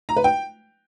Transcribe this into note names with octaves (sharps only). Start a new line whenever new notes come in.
A#5
B4
G5